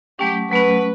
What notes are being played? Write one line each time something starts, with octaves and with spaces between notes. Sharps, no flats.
F#3 A3 C#4 G4
F#3 A3 C#4 B4